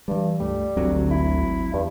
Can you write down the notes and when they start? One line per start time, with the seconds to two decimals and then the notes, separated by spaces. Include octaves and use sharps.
0.08 G2 E3 G3
0.40 C#2 G2 G3 A3
0.77 G#1 D2 F#3 C4
1.11 E4
1.74 E2 G2